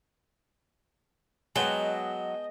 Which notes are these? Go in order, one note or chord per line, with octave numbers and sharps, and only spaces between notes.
F#3 G#3 B3 B4 D#5 G5 A5